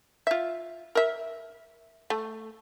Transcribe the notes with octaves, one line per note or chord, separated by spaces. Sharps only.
F4 E5
A#4 E5
A3